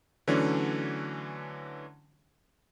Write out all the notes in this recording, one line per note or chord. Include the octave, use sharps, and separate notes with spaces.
D3 E3 F#3 A3 C#4 D4